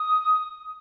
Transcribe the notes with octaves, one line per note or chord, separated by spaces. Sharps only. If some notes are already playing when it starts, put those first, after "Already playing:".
Already playing: D#6